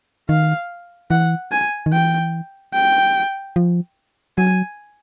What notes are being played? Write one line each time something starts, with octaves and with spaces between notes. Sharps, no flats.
D#3 F5
E3 F#5
G#5
D#3
E3 G5
G5
F3
F#3 G#5